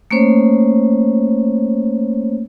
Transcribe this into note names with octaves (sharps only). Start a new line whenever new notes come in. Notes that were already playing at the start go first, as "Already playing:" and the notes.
A3 A#3 C#4 C5 C#5